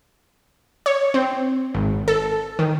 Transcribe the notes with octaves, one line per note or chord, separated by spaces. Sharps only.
C#5
C4
G#1
A4
D#3